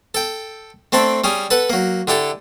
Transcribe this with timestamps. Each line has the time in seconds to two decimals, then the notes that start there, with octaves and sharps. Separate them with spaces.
0.14 A4 G5
0.92 A3 C4 D4 A4 B5
1.24 G3 C#4 G#4
1.50 A4 B4 F#5
1.70 F#3 A#3
2.07 D3 E4 G4 A4